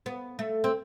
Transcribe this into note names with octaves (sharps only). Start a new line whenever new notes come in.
B3
A3
C4